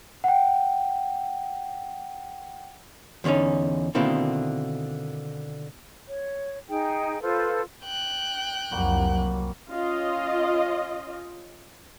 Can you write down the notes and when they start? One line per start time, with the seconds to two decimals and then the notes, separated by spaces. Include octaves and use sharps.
0.24 F#5 G5
3.24 E2 D3 C4 C#4 D#4
3.95 B2 D3 D#3 A#3 C4 E4
6.08 C#5
6.69 D#4 G#4 G5
7.22 F4 A4 B4 C5
7.83 G5 F#6
8.71 C2 F2 F#3 G3 A#3 F#4
9.69 C#4 F4 D#5